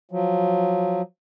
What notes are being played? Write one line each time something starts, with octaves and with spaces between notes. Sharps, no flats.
F3 F#3